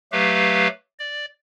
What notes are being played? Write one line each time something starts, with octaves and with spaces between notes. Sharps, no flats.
F#3 A3 G4 B4 F5
D5